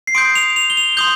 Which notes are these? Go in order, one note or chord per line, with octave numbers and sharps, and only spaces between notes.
C7
C6 D#6 G6 D7
F7
F7
G7
F7
C6 D#6 G6 G7